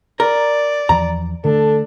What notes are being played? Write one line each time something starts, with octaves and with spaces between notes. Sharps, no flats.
A#4 D5
E2 E3 F3 A#5
D3 A3 D4 A4